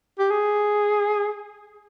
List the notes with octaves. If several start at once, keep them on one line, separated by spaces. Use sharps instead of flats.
G4
G#4